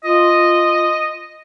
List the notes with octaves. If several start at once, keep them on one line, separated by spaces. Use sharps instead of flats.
F4 D#5